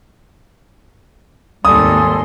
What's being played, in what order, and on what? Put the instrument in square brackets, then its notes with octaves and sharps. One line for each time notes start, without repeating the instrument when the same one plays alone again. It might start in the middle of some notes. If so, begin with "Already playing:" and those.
[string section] G#1 D#2 [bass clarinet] G3 [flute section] A4 G#5 C6 [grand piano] D#6